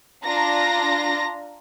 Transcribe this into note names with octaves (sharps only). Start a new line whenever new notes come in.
D4 F4 A#5 A#6